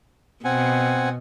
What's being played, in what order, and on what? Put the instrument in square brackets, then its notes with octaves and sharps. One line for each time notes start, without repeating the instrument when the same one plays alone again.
[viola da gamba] B2 [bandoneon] C4 F#5 G#5